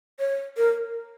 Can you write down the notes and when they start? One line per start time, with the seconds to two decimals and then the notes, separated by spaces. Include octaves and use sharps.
0.20 C#5
0.57 A#4